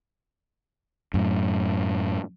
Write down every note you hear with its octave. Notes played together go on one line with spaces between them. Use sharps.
F#2 A2